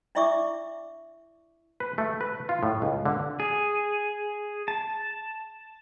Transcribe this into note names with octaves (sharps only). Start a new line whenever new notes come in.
D4 E4 D5 E5 C#6 D6
B4
A3
B4
F4
A2
C#2
D3
G#4
A5